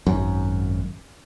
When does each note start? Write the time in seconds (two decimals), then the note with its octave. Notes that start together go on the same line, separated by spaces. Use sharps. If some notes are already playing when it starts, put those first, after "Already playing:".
0.06 G#1 F#2